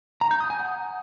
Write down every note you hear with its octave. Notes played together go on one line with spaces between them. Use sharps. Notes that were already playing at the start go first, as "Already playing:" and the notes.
A#5
G6
D#6
G#5
F#5